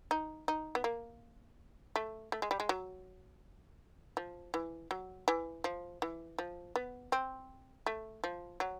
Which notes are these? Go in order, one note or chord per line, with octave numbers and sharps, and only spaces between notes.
D#4
D#4
B3
A#3
A3
A3
G#3
G3
G#3
F#3
F3
E3
F#3
E3
F3
E3
F3
B3
C4
A3
F3
F#3